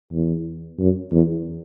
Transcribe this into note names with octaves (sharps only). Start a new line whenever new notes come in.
E2
F#2
E2